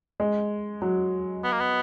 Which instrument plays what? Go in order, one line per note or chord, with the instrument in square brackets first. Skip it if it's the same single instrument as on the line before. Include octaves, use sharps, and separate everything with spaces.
[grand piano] G#3
F#3
[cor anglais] B3
A#3
B3